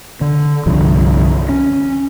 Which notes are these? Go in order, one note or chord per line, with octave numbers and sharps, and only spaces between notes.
D3
C2 G2 D3 F3
C#4